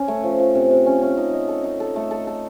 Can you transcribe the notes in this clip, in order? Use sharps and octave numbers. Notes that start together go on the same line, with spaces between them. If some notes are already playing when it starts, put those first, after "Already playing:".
Already playing: C#4
A3
F3
F3
C3
C3
C#4
C#4
D#4
D#5
A4
D#4
A4
A3
A4
A4